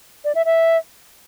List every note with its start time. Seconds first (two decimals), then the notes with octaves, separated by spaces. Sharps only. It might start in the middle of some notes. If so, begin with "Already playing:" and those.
0.24 D5
0.35 E5
0.45 E5